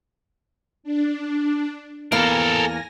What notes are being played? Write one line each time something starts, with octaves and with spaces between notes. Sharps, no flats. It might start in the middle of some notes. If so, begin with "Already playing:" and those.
D4
E2 A#3 A4 A#4 F5 G#5 A#6